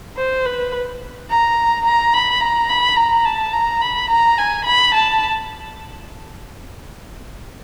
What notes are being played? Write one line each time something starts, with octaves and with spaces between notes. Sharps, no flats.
C5
B4
A#5
A#5
B5
A#5
B5
A#5
A5
A#5
B5
A#5
G#5
B5
A5